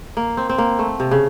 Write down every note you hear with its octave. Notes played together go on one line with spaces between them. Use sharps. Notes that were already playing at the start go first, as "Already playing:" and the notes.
A#3
C4
C4
A#3
A3
C3
C#3